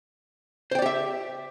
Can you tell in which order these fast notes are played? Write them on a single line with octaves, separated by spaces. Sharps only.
C5 G5 D5 G4 E5